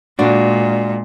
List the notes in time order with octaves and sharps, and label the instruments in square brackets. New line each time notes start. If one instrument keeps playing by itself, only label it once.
[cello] A#2 G#3 [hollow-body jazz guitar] D4 F#4